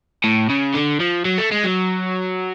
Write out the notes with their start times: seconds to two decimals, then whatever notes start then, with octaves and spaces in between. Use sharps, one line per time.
0.24 A2
0.49 C#3
0.74 D3
1.00 F3
1.25 F#3
1.38 A3
1.51 G#3
1.64 F#3